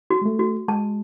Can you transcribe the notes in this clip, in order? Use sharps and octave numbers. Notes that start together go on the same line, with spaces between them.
F#4
G#3
A3
F#4
G#3 A5